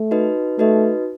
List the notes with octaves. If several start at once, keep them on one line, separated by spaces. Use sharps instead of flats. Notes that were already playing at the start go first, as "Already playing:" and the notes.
Already playing: A3
D#4 F#4 B4 D#5
A3 D#4 F#4 B4 D#5